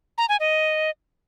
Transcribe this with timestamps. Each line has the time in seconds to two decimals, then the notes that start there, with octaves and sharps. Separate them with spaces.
0.18 A#5
0.29 G#5
0.40 D#5